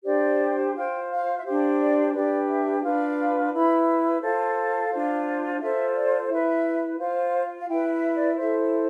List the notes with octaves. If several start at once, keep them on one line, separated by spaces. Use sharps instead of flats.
D4 G4 C5 D5
F4 C5 G5
F5
E5
D4 G4 C5 F5
D5
D4 G4 B4 D5
E5
D4 F4 B4 F5
E4 B4 B5
F4 A4 C5 F5
D4 F4 C5
F4 A4 C5 E5
D5
E4 B4 E5
F4 C5 F5
F5
E4 B4 G5
E5
D5
E4 A4 C5 E5